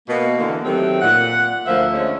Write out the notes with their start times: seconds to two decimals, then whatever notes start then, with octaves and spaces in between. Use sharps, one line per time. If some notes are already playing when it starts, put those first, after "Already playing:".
0.07 B2 A#3
0.38 D3 E3 A#3
0.64 D#3 F#3 A3 C4 G4
1.01 A#2 F#5
1.66 D2 F3 A#3 E5
1.94 D3 G#3 A3 C#4